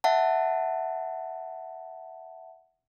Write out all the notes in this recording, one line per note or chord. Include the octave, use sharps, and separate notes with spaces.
E5 F#5 A5